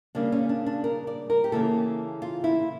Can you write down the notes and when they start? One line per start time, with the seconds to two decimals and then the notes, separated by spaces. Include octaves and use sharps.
0.15 C#3 G3 A#3 D4
0.32 C#4
0.49 D4
0.66 D4
0.84 A#4
1.07 D5
1.30 A#4
1.44 G4
1.52 C#3 E3 A#3 A4
2.22 F4
2.44 E4